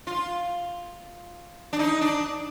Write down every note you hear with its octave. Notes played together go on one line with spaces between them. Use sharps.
F4
D4
D#4
D4